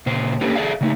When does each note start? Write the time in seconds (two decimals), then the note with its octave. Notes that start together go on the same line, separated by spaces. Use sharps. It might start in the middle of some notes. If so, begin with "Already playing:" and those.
0.06 A#2 C#3 C5
0.41 A#3 C#4 D4 G4 A4 B4
0.56 G#4 A4 D5 E5 F5
0.81 C#3 A3 D#4